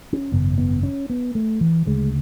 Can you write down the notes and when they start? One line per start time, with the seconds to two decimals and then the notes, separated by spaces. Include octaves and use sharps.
0.13 C#4
0.32 G#1 F#2 C#3 B3
0.58 B3
0.83 C#4
1.10 B3
1.35 A3
1.61 E3
1.86 D2 C#3 G#3